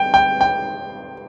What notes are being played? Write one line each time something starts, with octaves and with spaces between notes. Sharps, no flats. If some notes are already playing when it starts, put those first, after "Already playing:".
Already playing: G5
G5
G5